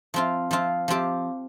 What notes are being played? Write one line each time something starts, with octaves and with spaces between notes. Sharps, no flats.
F3 C4 F4
F3 C4 F4
F3 C4 G4